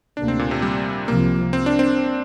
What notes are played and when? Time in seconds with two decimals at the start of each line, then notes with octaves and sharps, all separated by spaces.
0.17 D2 C3 A#3 D4
0.28 C4
0.39 A#2
0.51 C3
0.62 G3
1.07 C2 C3 F3 A#3
1.53 C4
1.66 D4
1.79 C4